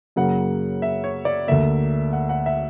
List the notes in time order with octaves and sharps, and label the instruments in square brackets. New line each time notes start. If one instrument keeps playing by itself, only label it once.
[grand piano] F#2 C#3 F#3 A#3 F#5
E5
C#5
D5
D2 D3 A#3 E5
F#5
F#5
E5